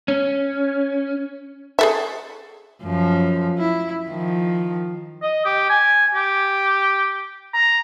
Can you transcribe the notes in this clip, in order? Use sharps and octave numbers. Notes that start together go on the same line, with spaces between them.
C#4
G#4 A4 E5
F#2 F3
E4
D#3 F3
D#5
G4
G#5
G4
A#5